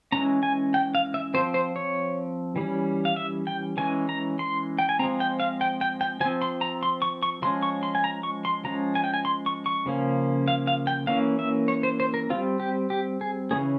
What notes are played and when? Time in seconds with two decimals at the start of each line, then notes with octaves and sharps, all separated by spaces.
0.12 E3 G#3 C#4 A#5
0.43 G#5
0.74 G5
0.95 F5
1.14 E5
1.34 F3 C4 C5
1.54 C5
1.76 C#5
2.56 E3 G3 C#4
3.05 F5
3.16 E5
3.47 G5
3.77 E3 G#3 C#4 G#5
4.09 A#5
4.39 C6
4.79 G5
4.89 G#5
4.99 C4 A#5
5.02 F3 G#3
5.20 G5
5.40 F5
5.61 G5
5.81 G5
6.01 G5
6.20 F3 G#5
6.25 C4
6.42 C6
6.61 A#5
6.83 C6
7.02 C#6
7.23 C#6
7.42 F3 G#3 C#4 C6
7.63 C#6
7.83 C6
7.95 G#5
8.04 A#5
8.23 C#6
8.45 C6
8.64 F3 G#3 C#4 A#5
8.95 G#5
9.04 G5
9.14 G#5
9.25 C6
9.46 C#6
9.66 C#6
9.86 C#3 F3 A#3 C#4
10.48 F5
10.67 F5
10.87 G5
11.07 E3 A#3 C#4 F5
11.39 E5
11.68 C#5
11.83 C5
12.00 C5
12.14 A#4
12.30 G3 C4 F4
12.60 G4
12.90 G4
13.21 G#4
13.51 C#3 E3 A#3 C#4 G#4